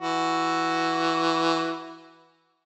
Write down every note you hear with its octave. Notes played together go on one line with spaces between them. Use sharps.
E3 F#4